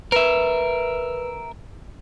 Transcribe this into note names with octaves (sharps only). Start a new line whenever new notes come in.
A#4 B4 E5